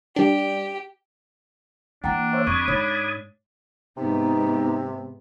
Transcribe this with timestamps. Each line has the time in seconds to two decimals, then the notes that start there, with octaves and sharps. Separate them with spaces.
0.16 G3 D4 G4
2.04 E3 A#3 D4 F#5 G5 A#5
2.33 C5 C#5 E5
2.47 F2 B5 C#6 D#6 G#6
2.68 G#2 C#5
3.97 G#2 C3 B3 D#4